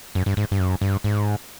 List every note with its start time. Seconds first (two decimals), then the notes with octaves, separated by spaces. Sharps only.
0.15 F#2
0.26 G2
0.37 G#2
0.52 G2
0.60 F#2
0.81 G2
1.04 G#2